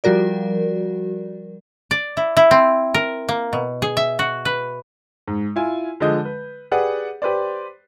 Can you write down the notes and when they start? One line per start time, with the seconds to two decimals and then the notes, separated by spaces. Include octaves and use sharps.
0.04 F3 G3 F#4 A#4 D5
1.91 D5
2.17 E4
2.37 E4
2.51 C4
2.94 A#4
3.29 A#3
3.53 B2
3.82 G#4
3.97 E5
4.19 F#4
4.45 B4
5.27 G#2
5.56 E4 F4 G#5
6.00 D3 F3 G#3 D#5 G6
6.25 B4
6.71 G4 G#4 B4 D5 F#5
7.22 G4 B4 C5 D5